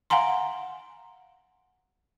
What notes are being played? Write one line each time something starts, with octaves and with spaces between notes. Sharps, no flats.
F5 F#5 G#5 A#5 C6